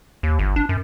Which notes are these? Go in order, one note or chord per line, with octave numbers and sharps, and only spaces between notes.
D#2
G1
D4
F#2